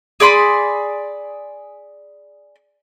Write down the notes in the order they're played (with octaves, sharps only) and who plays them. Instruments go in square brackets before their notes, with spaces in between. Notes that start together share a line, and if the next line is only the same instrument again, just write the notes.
[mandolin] G#4 D5 B5 C6